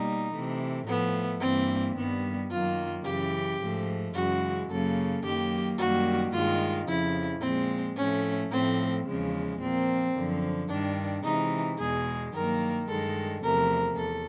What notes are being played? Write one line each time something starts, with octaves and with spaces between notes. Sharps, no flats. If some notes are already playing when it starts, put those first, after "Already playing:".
Already playing: B2 G3 A#3 D#4
C3 E3 A3
A2 F3 A3 B3
G2 E3 G3 A#3 C4
G2 D#3 G3 B3
F#2 D#3 F#3 A#3 F4
F#2 C#3 E3 G4
G#2 F3 A3
F#2 C#3 E3 G#3 F#4
F#2 C#3 F#3 A#3 A4
F#2 D#3 F#3 A#3 G4
F#2 D#3 G3 A#3 F#4
G2 D#3 G#3 F4
F2 C#3 F3 E4
A#2 F3 G#3 C4
A2 F3 A3 C#4
A2 F3 A3 C4
E2 C#3 F3 G#3
A#2 F3 A#3 C4
F#2 D3 F3
G2 D#3 G3 D4
C3 E3 G#3 D#4
E2 B2 G#3 G#4
G2 D#3 F#3 A#3 A#4
G2 D#3 G#3 A4
E2 C3 F3 A3 A#4
E2 A4